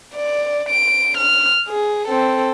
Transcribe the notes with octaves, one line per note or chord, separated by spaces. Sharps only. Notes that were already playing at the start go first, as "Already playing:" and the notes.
D5
D7
F6
G#4
C4 A4